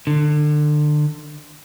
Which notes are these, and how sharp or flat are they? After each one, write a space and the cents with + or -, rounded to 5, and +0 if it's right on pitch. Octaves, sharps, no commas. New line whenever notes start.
D3 +30